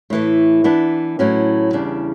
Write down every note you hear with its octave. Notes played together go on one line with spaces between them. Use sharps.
A2 E3 A3
E3 B3 D4
A2 F#3 C#4
E2 C#3 G3 D4